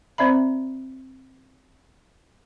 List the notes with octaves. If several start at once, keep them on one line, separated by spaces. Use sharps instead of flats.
C4 C5 D5 E5 A#5 B5